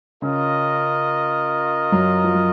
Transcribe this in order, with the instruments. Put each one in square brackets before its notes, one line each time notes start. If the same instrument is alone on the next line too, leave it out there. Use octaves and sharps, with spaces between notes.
[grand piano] C#3 C#4 [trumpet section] F4 A#4 D#5
[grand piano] F#2 F#3
F3
F#3